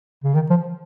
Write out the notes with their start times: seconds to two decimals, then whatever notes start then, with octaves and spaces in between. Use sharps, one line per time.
0.24 C#3
0.35 D#3
0.50 F3